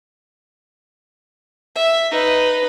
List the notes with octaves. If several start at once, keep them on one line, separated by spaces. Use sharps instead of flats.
E5
D#4 B4